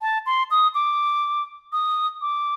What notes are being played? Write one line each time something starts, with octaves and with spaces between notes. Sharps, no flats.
A5
C6
D#6
D6
D#6
D6